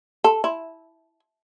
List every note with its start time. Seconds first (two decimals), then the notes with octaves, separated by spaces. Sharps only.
0.24 A4
0.44 E4